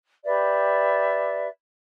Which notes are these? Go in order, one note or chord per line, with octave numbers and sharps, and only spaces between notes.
G4 B4 D5 E5